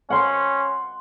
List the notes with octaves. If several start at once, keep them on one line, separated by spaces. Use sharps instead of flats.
C#4 F#5 C6